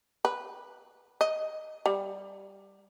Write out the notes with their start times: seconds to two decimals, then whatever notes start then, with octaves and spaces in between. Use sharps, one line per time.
0.25 B4
1.21 D#5
1.86 G3